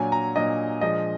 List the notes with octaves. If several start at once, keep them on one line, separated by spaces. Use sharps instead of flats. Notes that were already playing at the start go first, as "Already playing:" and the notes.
Already playing: A#2 F#3 D4 G#5
A#5
A#2 F#3 D4 D#5
A#2 F3 G#3 D4 D#5